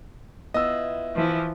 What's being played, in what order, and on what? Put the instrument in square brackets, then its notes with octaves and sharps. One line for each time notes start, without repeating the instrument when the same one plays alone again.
[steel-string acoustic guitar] B3 E4 F4 [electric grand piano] D#5 E6
[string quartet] E3 F3